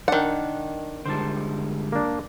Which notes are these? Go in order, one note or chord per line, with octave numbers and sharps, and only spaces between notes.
D#3 D4 F#5
D3 G3 G#3 C5 A5
A#3 D4